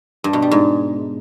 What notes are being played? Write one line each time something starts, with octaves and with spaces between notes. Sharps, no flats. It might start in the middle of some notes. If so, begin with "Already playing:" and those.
G2
B2
G3
G#2